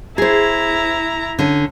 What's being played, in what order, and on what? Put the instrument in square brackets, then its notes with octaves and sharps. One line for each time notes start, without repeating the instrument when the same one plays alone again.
[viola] E4 A#5 [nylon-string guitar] G#4 C5
[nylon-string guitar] D3 C#4